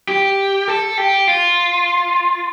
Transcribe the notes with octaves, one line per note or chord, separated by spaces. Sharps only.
G4
A4
G4
F4